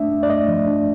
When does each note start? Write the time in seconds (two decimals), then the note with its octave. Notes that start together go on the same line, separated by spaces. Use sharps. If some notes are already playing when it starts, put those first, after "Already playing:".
Already playing: A3 D4 E5
0.12 D4
0.23 D5
0.30 A3 D#5
0.48 F3
0.67 D4